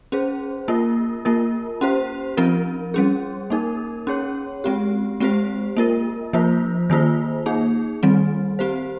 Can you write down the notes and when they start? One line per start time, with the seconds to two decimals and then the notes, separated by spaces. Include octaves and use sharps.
0.12 C#4 G#4 C5
0.68 A#3 F4 A#4
1.25 A#3 F4 A#4
1.81 C#4 G4 C5
2.37 F3 C4 F4 A#4
2.94 G3 C#4 G#4
3.50 A#3 D#4 A#4
4.07 C#4 G#4 C#5
4.64 G#3 C4 G4
5.20 G#3 C4 G4 C5
5.77 A#3 F4 A#4
6.33 F3 A#3 F4 C5
6.90 D#3 A#3 F4 C5
7.46 A#3 D#4 G#4
8.03 D#3 G3 C4
8.59 C4 G4 C5